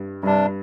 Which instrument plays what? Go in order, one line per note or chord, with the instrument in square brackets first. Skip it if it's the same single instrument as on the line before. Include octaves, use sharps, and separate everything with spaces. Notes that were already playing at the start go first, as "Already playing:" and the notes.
Already playing: [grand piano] G2
[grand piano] G2 [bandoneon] C3 G3 D4